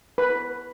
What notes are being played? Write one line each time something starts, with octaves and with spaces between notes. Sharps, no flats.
B4